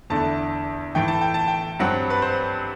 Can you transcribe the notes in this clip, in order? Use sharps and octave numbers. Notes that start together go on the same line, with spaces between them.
E2 D3 A3 E4 A5
A2 E3 A3 G5
A5
G5
A5
G5
G2 F#3 C4 F#5
B4
C5